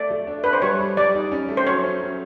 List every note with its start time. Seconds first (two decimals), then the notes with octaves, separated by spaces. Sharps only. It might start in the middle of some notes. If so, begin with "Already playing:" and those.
Already playing: A3 D5
0.11 A3
0.27 D4
0.44 D4 B4
0.53 C5
0.62 G3 C#5
0.80 G3
0.97 G3 D5
1.14 D#4
1.32 C#4
1.49 A3
1.57 C5
1.67 F#3 C#5
1.84 C#4
2.01 F#3